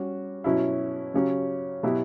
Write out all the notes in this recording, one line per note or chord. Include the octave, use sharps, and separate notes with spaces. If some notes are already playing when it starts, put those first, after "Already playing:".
Already playing: G3 C#4 F#4
B2 F#3 C#4 E4
C#3 F#3 C#4 G4
B2 F#3 B3 E4 G4